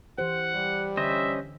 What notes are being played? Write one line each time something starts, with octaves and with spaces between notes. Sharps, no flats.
E3 G4 C5 F#5
G3
D3 C#4 C5 D#5 E5